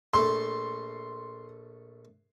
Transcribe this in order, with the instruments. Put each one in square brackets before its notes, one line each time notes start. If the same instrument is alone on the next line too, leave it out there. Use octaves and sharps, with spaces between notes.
[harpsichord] A#1 A3 [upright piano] C6